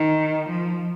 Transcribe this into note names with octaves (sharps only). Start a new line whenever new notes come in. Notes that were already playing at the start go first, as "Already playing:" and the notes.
Already playing: D#3
F3